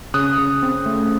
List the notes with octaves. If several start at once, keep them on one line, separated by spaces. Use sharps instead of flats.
C#3 D#6 F#6
C#3
C4
A3